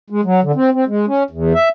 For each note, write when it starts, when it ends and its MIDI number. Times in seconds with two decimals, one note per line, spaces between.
0.10 0.21 56
0.24 0.40 54
0.43 0.52 50
0.55 0.70 60
0.73 0.85 60
0.88 1.06 56
1.07 1.23 61
1.30 1.53 40
1.54 1.69 76